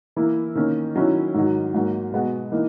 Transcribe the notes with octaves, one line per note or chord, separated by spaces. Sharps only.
E3 A#3 E4
D#3 A#3 C#4
D#3 F#3 C#4 E4
G#2 D#3 F#3
G#2 F#3 A#3
B2 G#3 B3 F#4
E3 A#3 D#4